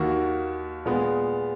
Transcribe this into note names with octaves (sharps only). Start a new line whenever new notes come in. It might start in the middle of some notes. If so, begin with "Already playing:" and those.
Already playing: D#2 D#3 A#3 F#4
A#2 G#3 B3